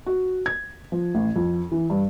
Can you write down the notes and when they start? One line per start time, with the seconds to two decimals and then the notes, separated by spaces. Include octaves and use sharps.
0.06 F#4
0.46 G#6
0.92 F3
1.15 A1
1.36 F2
1.72 E3
1.90 G2